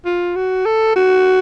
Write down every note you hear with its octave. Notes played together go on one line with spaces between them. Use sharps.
F4
F#4
A4
F#4